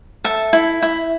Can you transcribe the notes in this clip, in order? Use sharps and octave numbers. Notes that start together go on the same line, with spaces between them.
A4 E5
E4
E4